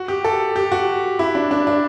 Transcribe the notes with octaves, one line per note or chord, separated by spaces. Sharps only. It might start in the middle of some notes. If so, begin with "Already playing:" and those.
Already playing: F#4
G4
A4
G4
F#4
E4
D4
D4
D4